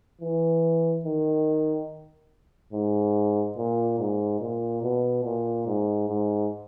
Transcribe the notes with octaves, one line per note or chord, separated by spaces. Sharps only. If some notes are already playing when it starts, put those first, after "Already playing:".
E3
D#3
G#2
A#2
G#2
A#2
B2
A#2
G#2
G#2